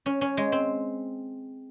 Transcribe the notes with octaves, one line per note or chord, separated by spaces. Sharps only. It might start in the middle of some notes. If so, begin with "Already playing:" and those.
C#4
C#4
G#3
C4